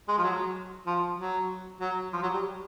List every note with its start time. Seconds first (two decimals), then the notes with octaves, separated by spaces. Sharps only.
0.08 G#3
0.18 F3
0.23 F#3
0.86 F3
1.19 F#3
1.80 F#3
2.13 F3
2.22 F#3
2.34 G3